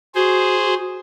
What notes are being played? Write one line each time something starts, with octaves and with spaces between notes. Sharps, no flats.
F#4 G#4 C5